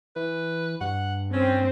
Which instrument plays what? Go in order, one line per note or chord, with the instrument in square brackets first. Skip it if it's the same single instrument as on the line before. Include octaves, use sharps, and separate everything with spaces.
[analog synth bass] E3 [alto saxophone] B4
[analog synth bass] G2 [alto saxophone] F#5
[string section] C4 [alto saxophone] C#4